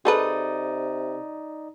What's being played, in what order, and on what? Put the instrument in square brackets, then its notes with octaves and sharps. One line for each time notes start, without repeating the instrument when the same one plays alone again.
[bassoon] C3 [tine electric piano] D#4 D5 D#6 [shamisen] G#4 A4 B4